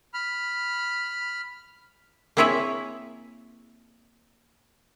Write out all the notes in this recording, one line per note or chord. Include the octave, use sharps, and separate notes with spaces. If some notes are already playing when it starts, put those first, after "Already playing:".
B5 F6
A#3 C4 E4 G#4 C#5 E5